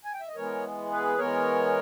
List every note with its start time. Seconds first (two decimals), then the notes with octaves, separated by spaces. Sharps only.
0.05 G#5
0.13 G5
0.20 E5
0.28 D#5
0.35 E3 G#3 B3 A#4 C#5
0.91 G#4 B4
1.18 E3 G#3 B3 A#4 C#5